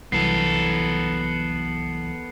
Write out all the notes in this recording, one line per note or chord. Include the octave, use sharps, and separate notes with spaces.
C2 E3 F#3 B3 A4 C7